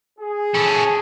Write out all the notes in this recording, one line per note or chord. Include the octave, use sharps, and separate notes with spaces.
G#4
C#4 A4